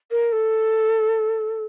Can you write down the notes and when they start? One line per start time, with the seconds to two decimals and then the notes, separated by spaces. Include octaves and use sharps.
0.10 A#4
0.32 A4